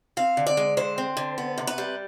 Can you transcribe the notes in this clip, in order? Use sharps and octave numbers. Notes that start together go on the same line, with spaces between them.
C4 F5
D3
D5
G#3
D3 C5
C4
D3
B3
C3
B4
G3